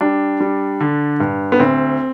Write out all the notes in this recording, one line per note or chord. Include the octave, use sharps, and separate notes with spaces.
G3 D4
G3
D3
G2
B3
D2 C4